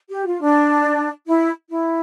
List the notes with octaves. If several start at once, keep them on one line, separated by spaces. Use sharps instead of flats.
G4
F4
D4
E4
E4